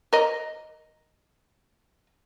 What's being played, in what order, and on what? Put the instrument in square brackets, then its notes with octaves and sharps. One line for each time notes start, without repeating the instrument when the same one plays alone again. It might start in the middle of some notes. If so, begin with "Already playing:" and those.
[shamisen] A#4 D#5